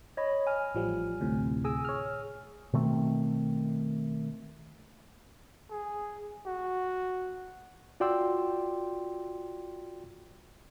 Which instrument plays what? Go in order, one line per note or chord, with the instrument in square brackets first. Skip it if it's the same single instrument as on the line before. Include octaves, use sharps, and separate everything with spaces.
[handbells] C#5 D#5 B5
G#5 F6
[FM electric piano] A1 F3 G3
D2 A2 C3
[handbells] G#4 G#5 E6
[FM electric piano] C#5 F6
[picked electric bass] B2 D#3 A3 C4
[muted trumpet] G#4
F#4
[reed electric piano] F4 F#4 D5 G5 C6 E6